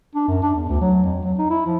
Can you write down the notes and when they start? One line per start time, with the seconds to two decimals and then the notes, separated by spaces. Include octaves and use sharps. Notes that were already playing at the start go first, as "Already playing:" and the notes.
0.15 D4
0.28 F#2
0.42 D4
0.55 E2
0.69 D2
0.81 F#3
1.04 F2
1.23 F#3
1.38 D#4
1.50 E4
1.66 F3